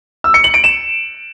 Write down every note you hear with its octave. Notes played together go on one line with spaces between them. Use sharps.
E6
C#7
F#7
D7
E7